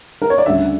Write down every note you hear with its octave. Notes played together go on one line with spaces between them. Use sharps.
A#4
C#5
D5
D2 C#3 G3 D4 E5